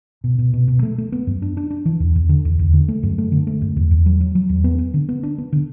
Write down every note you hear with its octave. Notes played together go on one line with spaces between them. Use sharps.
B2
B2
B2
B2
A3
A3
B3
F#2
D4
D4
D4
E3
E2
E2
D3
E2
E2
D3
A3
F#2
A3
D3
A3
F#2
E2
E2
F#3
F#3
F#3
E2
B3
B3
D3
B3
D4
B3
D3